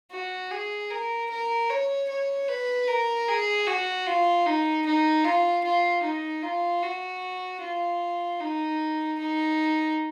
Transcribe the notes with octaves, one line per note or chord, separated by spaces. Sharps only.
F#4
G#4
A#4
A#4
C#5
C#5
B4
A#4
G#4
F#4
F4
D#4
D#4
F4
F4
D#4
F4
F#4
F4
D#4
D#4